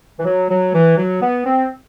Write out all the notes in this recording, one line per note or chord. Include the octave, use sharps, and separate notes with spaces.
E3
F#3
F#3
E3
F#3
B3
C4